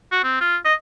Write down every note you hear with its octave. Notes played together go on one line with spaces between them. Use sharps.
F#4
C4
F4
D#5